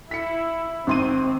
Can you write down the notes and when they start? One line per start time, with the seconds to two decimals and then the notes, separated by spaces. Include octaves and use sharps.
0.11 E4 B6 C#7
0.87 G#1 C4 C6 D#7